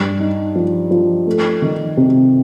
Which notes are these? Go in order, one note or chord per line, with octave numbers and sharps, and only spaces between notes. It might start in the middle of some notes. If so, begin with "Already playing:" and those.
Already playing: G2
D#4
F3
F3
A3
D#3
C3